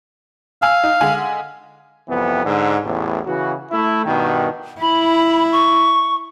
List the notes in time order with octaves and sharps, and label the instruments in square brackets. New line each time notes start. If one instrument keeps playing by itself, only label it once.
[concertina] F5 [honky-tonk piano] G#5 E6
[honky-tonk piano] D#4
D3 G#3 G#5
[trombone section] C2 F2 E3 B3
G#2 D3
A1 E2 A2
C#3 E3 F#4
A3 E4
G2 B2 D#3
[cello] E4 [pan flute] B5
[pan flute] C#6